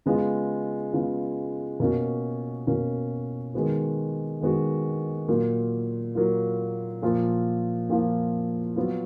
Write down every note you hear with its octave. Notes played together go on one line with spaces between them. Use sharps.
C#3 G#3 B3 F4
C#3 G#3 B3 F4
B2 A#3 C#4 F#4
B2 A#3 C#4 F#4
D#3 G#3 B3 F#4
D#3 G#3 B3 F#4
A#2 F#3 A#3 F4
A#2 F#3 A#3 F4
A#2 F3 A#3 F4
A#2 F3 A#3 F4
F#3 B3 F4